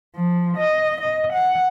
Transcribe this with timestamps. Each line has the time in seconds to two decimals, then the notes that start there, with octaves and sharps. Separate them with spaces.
0.16 F3
0.58 D#5
1.02 D#5
1.33 F#5